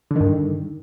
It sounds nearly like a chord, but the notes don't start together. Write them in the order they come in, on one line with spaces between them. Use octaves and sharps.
D3 D#3 G2